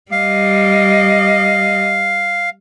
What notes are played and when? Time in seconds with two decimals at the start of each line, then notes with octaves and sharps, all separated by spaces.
0.12 G3 D#5 F5